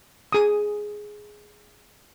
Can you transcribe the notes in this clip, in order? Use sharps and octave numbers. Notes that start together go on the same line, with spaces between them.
G#4 D#6